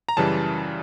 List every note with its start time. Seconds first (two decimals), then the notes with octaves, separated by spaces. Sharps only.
0.09 A#5
0.17 F#2 C#3 E3 G3 A5